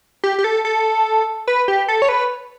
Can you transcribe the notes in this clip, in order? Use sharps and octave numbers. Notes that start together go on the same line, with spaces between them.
G4
G4
A4
A4
B4
G4
A4
C#5
B4